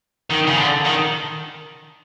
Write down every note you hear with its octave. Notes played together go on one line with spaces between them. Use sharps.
D#3
C#3
D3
D#3